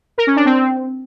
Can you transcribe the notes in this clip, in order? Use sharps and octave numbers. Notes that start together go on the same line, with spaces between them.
A#4
C#4
D4
C4